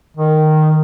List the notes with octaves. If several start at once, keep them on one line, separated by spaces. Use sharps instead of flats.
D#3